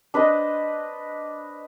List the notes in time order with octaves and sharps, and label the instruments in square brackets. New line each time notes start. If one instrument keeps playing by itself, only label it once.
[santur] D4 B4 C5 D#5